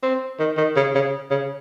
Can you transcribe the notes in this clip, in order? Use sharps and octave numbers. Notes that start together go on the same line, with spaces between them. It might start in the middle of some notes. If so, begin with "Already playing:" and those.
C4
D#3
D#3
C#3
C#3
C#3